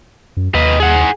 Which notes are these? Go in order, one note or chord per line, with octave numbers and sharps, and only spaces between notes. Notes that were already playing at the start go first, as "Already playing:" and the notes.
F#2
D#2 D#4 B4
G#4 F#5